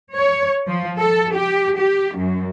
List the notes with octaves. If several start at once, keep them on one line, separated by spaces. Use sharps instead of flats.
C#5
F3
A4
G4
G4
F#2